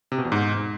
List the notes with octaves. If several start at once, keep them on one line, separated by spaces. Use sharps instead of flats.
C3
B2
E2
G#2